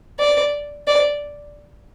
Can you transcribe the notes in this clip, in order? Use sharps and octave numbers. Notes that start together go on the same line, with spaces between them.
D5
D5